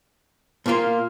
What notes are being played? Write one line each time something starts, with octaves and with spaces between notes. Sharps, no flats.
A#2 A#3 F4